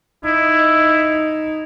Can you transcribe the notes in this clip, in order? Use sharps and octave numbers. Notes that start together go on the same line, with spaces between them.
D#4 E4